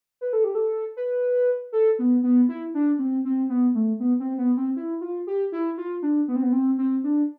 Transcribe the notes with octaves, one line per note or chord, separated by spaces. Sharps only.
B4
A4
G4
A4
B4
A4
B3
B3
E4
D4
C4
C4
B3
A3
B3
C4
B3
C4
E4
F4
G4
E4
F4
D4
B3
C4
B3
C4
C4
D4